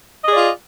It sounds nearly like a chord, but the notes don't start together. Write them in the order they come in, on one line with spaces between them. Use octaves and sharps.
D#5 G#4 D5 F4